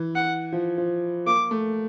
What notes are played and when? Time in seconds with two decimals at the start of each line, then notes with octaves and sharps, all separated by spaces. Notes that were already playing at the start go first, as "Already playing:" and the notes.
Already playing: E3
0.15 F#5
0.52 F3
0.78 F3
1.27 A#3 D6
1.51 A3